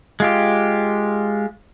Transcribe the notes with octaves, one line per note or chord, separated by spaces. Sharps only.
G#3 F4 G4